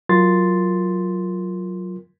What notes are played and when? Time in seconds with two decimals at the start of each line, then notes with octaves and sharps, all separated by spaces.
0.09 F#3 F4 A#4 C6 A6